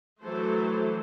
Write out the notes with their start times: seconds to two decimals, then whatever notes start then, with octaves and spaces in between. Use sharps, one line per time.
0.22 E3 F#3 A3 A4 C5